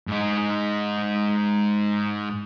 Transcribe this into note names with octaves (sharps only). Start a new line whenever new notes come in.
G#2 D#4